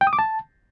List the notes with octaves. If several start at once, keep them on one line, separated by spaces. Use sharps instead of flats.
G5
D#6
D6
A5